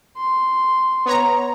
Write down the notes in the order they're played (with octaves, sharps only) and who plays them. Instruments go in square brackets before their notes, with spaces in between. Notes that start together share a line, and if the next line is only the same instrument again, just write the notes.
[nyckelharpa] C6
[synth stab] B3 C#5 A#5